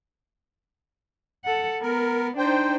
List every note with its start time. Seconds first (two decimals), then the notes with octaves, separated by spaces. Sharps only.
1.45 A4 F#5
1.82 B3 A#4
2.38 D4 D#4 C5 G5